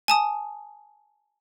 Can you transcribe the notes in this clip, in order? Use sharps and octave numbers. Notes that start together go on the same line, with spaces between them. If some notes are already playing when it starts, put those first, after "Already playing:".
G#5 A5 D#6